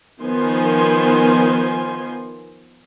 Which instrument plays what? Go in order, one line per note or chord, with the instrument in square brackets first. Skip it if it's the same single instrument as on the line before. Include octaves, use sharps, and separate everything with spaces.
[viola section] D#3 F3 B3 G#5 C6